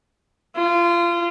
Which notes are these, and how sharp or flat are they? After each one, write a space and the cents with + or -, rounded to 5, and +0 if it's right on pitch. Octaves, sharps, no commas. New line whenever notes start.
F4 -25